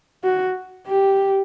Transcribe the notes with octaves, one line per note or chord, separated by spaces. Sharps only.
F#4
G4